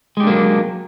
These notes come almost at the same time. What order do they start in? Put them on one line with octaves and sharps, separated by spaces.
G#3 G4 D4 A#3 F#3